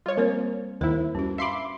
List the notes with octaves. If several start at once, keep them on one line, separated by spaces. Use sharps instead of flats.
G3 F4 C#5
A#3 C4 C5 C#5
D#2 E4 A#4 C5
G2 C#4 F#4
E5 F5 B5 C6 D6